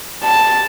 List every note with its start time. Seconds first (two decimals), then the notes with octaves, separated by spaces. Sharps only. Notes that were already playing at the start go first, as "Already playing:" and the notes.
0.23 A5